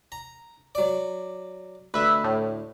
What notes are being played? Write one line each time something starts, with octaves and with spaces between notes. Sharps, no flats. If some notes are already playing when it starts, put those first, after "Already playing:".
A#5
F#3 D5
D2 B4 E5
A2